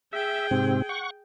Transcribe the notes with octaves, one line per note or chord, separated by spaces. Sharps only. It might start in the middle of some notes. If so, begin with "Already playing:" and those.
G#4 E5 G5
G#2 C3 C4
F#5 C#6